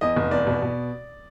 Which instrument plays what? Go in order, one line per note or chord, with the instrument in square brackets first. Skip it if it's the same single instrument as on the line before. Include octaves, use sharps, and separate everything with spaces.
[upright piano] E2 D#5
F1
E2 D5
B2
B2